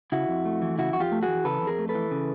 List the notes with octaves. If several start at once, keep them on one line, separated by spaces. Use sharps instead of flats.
C#3 E4 F#4
F2
A3
E3
C#3 E4 F#4
F2 F#4
F4 G4
A3
F#4 G#4
E3
C#3 A4 B4
F2
G#4 A#4
A3
A4 B4
E3
C#3